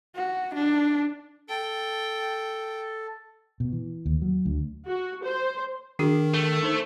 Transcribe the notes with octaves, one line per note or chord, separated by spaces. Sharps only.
F#4
D4
A4 G5
B2
E3
D#2
F#3
D2
F#4
C5
D#3 D4 F#4 G#4
A3
D#4 C5